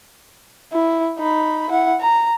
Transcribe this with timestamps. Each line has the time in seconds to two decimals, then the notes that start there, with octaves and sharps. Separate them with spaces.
0.73 E4
1.18 D#4 B5
1.70 E4 F#5
2.01 A#5